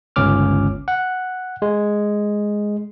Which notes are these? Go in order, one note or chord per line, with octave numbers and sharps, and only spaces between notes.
G1 C#2 C#4 D6 F6
F#5
G#3